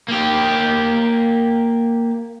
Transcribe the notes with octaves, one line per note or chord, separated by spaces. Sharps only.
A#3 G4